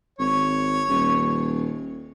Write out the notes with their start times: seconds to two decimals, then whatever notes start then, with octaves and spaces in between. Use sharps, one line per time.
0.19 G#1 C#5
0.89 D#1